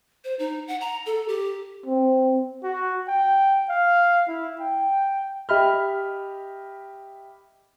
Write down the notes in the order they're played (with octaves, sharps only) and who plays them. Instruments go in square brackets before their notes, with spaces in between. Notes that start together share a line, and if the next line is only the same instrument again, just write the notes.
[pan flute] C5
D#4
F#5
A#5
A4
G4
[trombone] C4
[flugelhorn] F#4
G5
F5
E4
G5
[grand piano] G4 D#5 E5 B5 F6